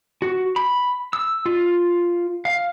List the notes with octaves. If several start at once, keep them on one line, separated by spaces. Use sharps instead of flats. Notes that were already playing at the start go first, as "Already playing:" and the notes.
F#4
B5
E6
F4
F5